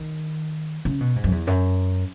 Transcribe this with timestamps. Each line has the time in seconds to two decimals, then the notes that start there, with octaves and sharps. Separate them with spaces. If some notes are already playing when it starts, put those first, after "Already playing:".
Already playing: D#3
0.85 C#3
1.01 B2
1.16 G#2
1.24 F#2
1.32 E2
1.47 F#2